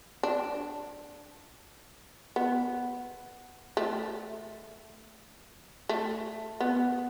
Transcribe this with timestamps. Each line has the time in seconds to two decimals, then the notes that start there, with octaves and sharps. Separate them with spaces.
0.23 D4
2.36 B3
3.77 A3
5.89 A3
6.60 B3